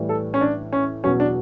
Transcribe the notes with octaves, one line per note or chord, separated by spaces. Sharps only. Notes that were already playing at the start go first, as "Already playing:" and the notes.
Already playing: A2 E3 G3
A4
C#4
D4
C#4
E2 B2 F#3 C#4
D4